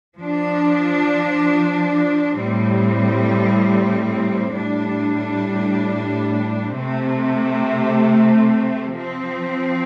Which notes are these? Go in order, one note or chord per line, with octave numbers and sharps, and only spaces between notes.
F3 D4
A2 G3 C4
A2 G3 D4
C3 A3 C4
F3 C4